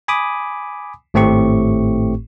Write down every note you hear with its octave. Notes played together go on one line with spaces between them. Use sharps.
G#5 B5 D6 D#6
G#1 A2 A3 C4 G4 C#6